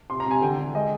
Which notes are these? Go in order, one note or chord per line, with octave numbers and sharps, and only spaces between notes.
C3 C6
A#5
C3 G#5
D3 G5
D3
G#3 D#5